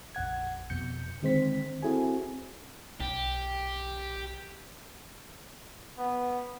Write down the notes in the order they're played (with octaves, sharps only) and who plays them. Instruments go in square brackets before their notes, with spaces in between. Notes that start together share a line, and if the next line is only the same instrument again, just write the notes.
[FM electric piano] A#1 F2 F#5 G#6
F2 B2 G6 C#7
D3 D#3 G#3 C4 C5 B6
C4 E4 F#4 G#4 A4 G#5
[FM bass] B1 [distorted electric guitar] G4
[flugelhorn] B3